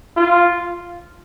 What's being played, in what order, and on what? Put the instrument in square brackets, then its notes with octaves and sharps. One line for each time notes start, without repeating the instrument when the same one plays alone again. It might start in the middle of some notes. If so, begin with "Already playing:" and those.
[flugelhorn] F4